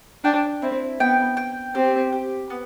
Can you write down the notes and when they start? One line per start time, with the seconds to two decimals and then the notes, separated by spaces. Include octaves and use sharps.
0.24 D4 G5
0.62 C4 E4
1.00 B3 G5
1.37 G5
1.75 C4 G4
2.12 G4
2.50 B3